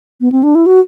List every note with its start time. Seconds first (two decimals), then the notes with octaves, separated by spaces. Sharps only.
0.21 B3
0.32 C4
0.43 D4
0.55 E4
0.66 F#4